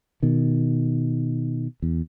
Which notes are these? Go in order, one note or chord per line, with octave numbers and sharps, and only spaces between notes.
B2 D#3
E2